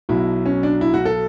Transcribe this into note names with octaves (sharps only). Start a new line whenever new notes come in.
B1 B2 F#3 E4
C#4
D4
E4
F#4
A4